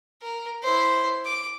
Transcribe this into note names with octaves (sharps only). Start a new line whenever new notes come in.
A#4
E4 C5
D6